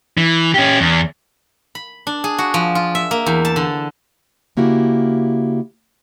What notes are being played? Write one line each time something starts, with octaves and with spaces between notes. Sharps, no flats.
E3
C#4 G4
E2
B5
D4
G#4
F#4
F3
F4
E5
A#3
E2
A5
D3
C#3 A#3 E4 F#4 G4